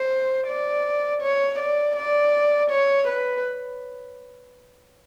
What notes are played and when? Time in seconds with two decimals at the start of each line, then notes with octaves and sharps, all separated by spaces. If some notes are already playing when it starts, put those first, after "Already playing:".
Already playing: C5
0.47 D5
1.22 C#5
1.59 D5
1.96 D5
2.71 C#5
3.08 B4